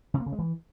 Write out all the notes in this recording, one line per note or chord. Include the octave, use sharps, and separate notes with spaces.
C3
A#3
C#3
G#3
E3